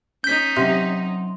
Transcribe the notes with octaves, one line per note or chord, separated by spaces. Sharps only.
C#4 D#4 G6 B6
C3 F#3 C6